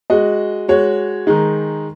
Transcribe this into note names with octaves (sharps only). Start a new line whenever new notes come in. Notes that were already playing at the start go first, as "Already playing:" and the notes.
G#3 F#4 D#5
G#3 F#4 C#5
D#3 G#3 D#4